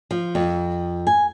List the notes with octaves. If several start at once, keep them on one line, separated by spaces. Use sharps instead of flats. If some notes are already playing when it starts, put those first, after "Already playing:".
F3
F2
G#5